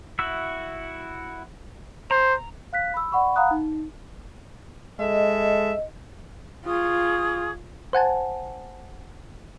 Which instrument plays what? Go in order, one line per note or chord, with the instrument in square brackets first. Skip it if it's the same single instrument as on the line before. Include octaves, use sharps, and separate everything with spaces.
[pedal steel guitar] E4 F#4 E5
[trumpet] C5 [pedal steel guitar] A#5
[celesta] F5 F#6 B6
B5 E6
D5 F#5 B5 C#6
F5 F#5 A#5 B5 D#6 F#6
D#4
[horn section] G#3 A4 E5 [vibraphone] D#5
[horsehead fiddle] F4 [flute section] G#4 C#6 D#6
[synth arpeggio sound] C5 F#5 G#5 A5